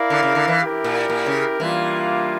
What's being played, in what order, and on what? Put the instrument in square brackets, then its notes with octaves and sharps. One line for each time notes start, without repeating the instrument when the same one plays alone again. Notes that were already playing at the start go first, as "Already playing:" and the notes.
Already playing: [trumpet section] E4 A#4 D5 F5
[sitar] D3
C#3
D3
E3
[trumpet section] E4 G4 A#4
[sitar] A#2
A#2
C#3
[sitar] E3 [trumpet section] G3 A#3 D4 F4